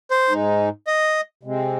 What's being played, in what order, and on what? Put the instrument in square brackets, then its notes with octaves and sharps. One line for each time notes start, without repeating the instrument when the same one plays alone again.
[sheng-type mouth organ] C5
[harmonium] G#2 G#3 D#4
[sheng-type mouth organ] D#5
[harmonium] C3 G#3 C4